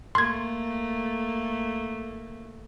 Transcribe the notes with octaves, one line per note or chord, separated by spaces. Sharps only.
A3 A#3 C6 G#6